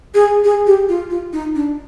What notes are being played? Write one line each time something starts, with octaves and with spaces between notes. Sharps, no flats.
G#4
G#4
G4
F4
F4
D#4
D4